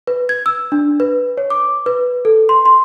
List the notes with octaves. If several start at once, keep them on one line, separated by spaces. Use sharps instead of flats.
B4
G#6
E6
D4
B4
C#5
D6
B4
A4
C6
C6